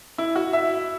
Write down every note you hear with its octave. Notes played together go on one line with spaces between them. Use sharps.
E4
F#4
E5